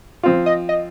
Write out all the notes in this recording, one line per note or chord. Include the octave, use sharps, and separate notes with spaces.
F3 C4 F4
D#5
D#5